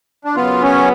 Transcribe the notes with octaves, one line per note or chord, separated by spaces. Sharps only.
D4
F#2 C#3 F#3 B3 F4
C#4